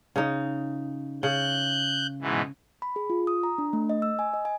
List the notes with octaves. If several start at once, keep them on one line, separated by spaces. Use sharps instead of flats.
C#3 D#4
C#3 F#6 G6
G#2 B2 E3
B5
G#4
F4
D#6
A#5
D4
A3
D#5
E6
G#5
D#5
G#5